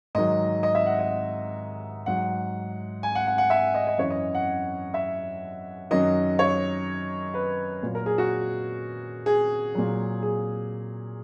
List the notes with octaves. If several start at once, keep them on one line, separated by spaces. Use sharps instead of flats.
G#2 D#3 F#3 D#5
D#5
E5
F#5
D#5
G#2 F#3 F#5
G#5
F#5
F#5
F#5
E5
D#5
D#5
F#2 E3 C#5
D#5
F#5
E5
F#2 D#3 F#3 D#5
C#5
B4
A#2 F#3
A#4
G#4
F#4
G#4
A#2 F#3
G#4